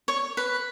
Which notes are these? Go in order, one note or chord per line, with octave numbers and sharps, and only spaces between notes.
C#5
B4